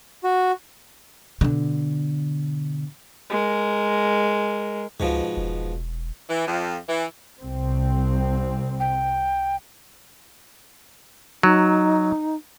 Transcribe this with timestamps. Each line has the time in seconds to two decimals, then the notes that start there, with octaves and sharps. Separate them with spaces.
0.24 F#4
1.41 B2 D3
3.30 G#3 A#4
5.00 C#2 G#2 B2 F3
5.37 E1
6.29 E3
6.47 F2
6.89 E3
7.39 C2 C4
8.80 G5
11.43 F#3 D#4